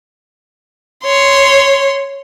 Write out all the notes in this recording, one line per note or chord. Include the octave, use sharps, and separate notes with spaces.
C#5 C6